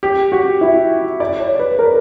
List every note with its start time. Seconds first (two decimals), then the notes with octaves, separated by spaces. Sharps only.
0.03 G4
0.32 F#4
0.61 E4
1.20 D5
1.40 C#5
1.59 B4
1.79 A#4